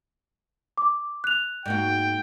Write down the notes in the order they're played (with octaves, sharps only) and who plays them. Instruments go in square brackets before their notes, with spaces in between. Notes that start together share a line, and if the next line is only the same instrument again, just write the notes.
[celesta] D6
F#6 F7
[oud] G#2 A#3 F#4 [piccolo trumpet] G5